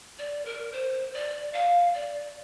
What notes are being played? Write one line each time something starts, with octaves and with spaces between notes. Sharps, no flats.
D5
A#4
C5
D5
F5
D5